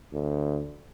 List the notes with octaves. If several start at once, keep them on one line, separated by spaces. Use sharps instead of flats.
D2